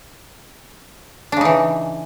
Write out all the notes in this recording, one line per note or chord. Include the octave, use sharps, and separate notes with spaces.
C#3 E3 D4 D#4